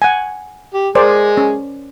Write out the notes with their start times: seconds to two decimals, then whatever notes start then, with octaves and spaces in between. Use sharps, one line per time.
0.02 F#5 G#5
0.74 G4
0.95 G#3 G#4 A#4 C5 D5
1.37 C#4